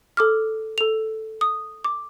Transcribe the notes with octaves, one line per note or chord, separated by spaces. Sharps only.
A4 D6 F6
A4 F7
D#6
D6